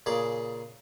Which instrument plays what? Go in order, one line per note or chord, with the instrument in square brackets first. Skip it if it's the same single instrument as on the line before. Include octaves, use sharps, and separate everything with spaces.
[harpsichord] A#2 C#3 G#4 D6